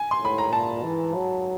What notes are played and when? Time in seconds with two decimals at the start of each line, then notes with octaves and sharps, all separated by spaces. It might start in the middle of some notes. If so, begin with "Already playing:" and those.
Already playing: G#5
0.11 C6
0.22 A2 B5
0.38 A#5
0.52 A#2 A5
0.83 E3
1.15 F#3